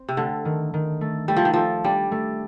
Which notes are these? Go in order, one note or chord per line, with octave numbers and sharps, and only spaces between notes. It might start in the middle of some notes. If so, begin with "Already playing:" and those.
Already playing: C4
C3
D3 A3
D#3
D#3
A3
G3 A3
F3
D#3
F3 A4
G3 D4
A3